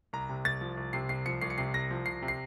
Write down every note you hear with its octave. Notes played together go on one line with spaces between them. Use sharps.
C2 A#5
C3
C2 A6
F3
C2
C3 C7
C2 C7
F3 C#7
C2 C7
C#7
C3 C7
C2 A#6
F3
C2 C7
C3
C7